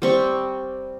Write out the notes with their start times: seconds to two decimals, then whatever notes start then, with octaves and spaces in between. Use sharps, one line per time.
0.02 G3 C4 C#6